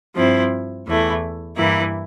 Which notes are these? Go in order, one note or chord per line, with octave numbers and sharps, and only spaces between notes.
G2 F3 C4 E4
E2 E3 A3 E4
G2 E3 A#3 E4